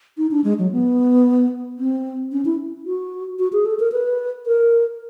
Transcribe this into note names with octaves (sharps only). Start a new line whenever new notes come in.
D#4
D4
G#3
F#3
B3
C4
C#4
E4
F#4
F#4
G#4
A4
A#4
B4
A#4